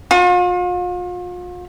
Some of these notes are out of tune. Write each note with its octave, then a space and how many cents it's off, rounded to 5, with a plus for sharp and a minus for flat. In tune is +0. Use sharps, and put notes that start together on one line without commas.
F4 +40